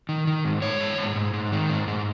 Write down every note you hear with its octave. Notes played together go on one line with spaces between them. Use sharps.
D#3
D#3
G#2
G#2 C#5
G#2
G#2
G#2
G#2
D#3
G#2
G#2